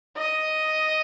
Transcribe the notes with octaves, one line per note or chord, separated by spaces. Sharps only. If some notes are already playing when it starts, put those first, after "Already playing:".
D#5